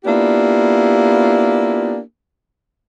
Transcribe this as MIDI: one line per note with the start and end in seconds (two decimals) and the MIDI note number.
0.05 1.98 58
0.05 1.98 59
0.05 1.98 62
0.05 1.98 64
0.05 1.98 65
0.05 1.98 67